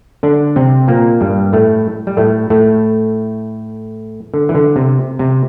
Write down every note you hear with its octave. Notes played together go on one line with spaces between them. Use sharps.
D3 D4
C3 C4
A#2 A#3
G2 G3
A2 A3
G3
A2 A3
A2 A3
D3
E3
D3
C3
C3